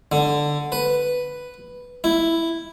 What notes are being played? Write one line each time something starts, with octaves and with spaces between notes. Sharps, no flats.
D3
B4
E4